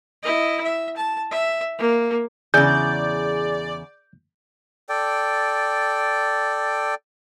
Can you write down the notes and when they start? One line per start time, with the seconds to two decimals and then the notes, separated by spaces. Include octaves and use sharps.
0.23 E4 D#5
0.64 E5
0.96 A5
1.31 E5
1.78 A#3
2.54 E2 C#3 G#4 D5 G6
4.89 A4 D5 G5